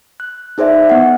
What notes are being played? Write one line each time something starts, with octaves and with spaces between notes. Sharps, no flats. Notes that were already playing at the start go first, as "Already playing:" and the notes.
F#6
D#4 G#4 C5 D5 E5
B3 F#5